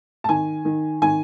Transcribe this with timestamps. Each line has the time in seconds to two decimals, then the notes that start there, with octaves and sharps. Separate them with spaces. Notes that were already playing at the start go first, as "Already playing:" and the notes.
0.24 A5
0.29 D#3 G#5
0.65 D#3
1.02 D#3 G#5